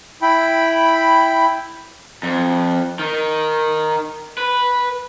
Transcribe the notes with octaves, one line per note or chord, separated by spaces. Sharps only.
E4 G5 B5
F2
D#3
B4